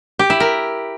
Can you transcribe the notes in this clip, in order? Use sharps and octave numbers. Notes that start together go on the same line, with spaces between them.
G4
E4
A#4